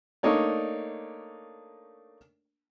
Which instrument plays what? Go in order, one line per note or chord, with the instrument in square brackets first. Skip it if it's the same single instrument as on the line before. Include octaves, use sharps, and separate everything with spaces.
[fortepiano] A3 A#3 D4 D#4 C#5 D5